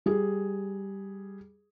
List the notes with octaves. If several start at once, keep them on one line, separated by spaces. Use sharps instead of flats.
G3 G#4